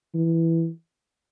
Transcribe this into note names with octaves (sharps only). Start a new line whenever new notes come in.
E3